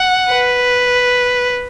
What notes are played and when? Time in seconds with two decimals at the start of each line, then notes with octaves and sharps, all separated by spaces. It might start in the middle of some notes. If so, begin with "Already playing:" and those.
Already playing: F#5
0.30 B4